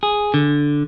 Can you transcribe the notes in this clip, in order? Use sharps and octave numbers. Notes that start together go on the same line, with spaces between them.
G#4
D3